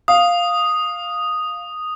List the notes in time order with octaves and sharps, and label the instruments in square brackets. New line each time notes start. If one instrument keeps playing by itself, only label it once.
[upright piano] F5 [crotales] D#6